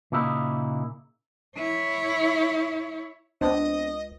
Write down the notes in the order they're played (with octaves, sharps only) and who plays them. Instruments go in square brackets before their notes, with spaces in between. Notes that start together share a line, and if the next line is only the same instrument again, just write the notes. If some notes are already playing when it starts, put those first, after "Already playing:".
[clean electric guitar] A#2 C#3 A#3 D#4 E4
[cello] E4 C#5
[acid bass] C#2 [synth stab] B3 C4 D4 [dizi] D#5